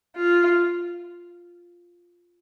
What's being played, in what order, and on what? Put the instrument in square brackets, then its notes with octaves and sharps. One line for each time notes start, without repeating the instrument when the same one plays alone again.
[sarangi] F4